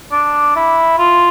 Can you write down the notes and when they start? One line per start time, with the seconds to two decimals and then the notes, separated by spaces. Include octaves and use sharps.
0.12 D4
0.56 E4
0.98 F4